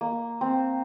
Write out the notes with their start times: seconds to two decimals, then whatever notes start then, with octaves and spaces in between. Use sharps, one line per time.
0.01 A#3
0.41 C4